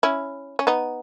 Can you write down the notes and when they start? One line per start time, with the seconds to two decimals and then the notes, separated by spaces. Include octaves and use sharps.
0.03 C#4 E4
0.59 C#4
0.67 B3 D#4